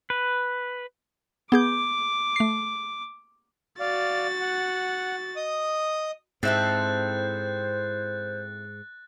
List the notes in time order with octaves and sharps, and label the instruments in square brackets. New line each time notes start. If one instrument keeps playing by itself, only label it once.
[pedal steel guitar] B4
[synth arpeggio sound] B3 G#4 G6 [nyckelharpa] D6
[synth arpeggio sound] A3 C7
[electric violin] F#4 A6 [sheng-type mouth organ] D5 F5
[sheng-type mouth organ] F#5
D#5 D#6
[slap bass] G#2 [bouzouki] C4 E4 A4 [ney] C5 [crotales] F#6 A6